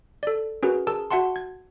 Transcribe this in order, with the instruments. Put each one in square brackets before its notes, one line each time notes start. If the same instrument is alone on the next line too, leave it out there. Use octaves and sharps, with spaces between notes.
[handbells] A4 D5
C#4 F#4 G#4 A#4 B4
G#4 A#4 A5 E6
F#4 E5 F#5 A5 C6
G#6